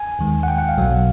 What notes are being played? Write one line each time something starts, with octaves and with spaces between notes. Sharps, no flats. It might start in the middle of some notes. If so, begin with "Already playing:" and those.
Already playing: G#5
D#2 D#3 G#3
F#5
G5
F#5
F5
B1 B2 F#3